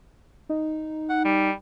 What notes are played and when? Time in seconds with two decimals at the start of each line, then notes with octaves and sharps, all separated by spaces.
0.49 D#4
1.09 F#5
1.25 G3